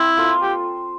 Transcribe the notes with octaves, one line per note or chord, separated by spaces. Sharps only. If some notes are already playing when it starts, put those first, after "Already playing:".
Already playing: C4 E4
A#3 F4 A4 C5
G4